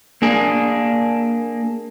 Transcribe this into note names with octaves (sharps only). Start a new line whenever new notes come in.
A#3 D4 G#4